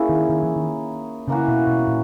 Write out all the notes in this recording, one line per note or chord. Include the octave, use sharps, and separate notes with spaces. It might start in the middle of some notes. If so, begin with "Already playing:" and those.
Already playing: A#3 C#4 E4 G#4
D#3
D#3
E3
D#3
C#3 E3 A#3 C#4 F#4
B2
B2
A#2